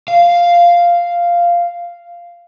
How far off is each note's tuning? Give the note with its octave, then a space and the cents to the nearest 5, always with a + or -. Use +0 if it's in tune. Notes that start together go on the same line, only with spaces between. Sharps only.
F5 -5